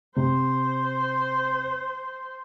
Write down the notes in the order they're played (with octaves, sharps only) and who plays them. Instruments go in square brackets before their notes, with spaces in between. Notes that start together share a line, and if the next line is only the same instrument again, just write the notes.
[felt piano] C3 [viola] C5